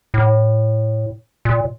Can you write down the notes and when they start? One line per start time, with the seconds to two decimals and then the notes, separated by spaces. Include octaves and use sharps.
0.14 A2
1.45 A#2